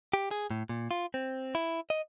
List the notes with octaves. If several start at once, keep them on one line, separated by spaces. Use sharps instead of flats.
G4
G#4
A2
A#2
F4
C4
E4
D#5